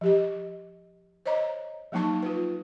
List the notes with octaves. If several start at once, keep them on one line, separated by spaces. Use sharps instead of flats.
F3 G4 D#5
C5 C#5 D#5 A#5
F3 F#3 A#3 D#4 A5 C#6
F4 B4